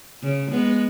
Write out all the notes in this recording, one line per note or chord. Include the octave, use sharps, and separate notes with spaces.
C#3
G#3 B3